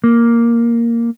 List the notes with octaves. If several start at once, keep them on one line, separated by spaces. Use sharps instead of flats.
A#3